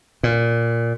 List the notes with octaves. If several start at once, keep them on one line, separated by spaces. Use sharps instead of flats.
A#2